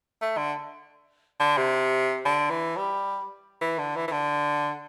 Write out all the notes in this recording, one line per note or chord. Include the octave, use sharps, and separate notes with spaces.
A3
D3
D3
C3
D3
E3
G3
E3
D3
E3
E3
D3